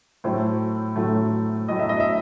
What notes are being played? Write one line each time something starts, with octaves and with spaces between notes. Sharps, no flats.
A2 F#3 A3 C5
A2 F#3 A3
A2 F#3 A3 D#5
E5
D#5
E5